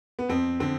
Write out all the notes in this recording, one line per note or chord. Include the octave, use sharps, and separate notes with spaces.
B3
F2 C4
D3 C4